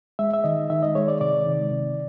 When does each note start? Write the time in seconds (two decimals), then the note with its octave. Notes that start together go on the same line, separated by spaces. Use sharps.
0.19 G#3 E5
0.33 E5
0.44 D#3 D#5
0.70 D#3 E5
0.83 D#5
0.95 G#3 C#5
1.08 D5
1.21 C3 D5
1.46 D#3
1.72 C3